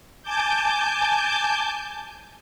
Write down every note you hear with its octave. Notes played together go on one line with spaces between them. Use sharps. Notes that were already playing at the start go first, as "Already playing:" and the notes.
G#5 A5 D6 G6